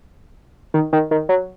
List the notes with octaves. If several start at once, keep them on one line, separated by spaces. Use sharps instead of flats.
D#3
D#3
D#3
F#3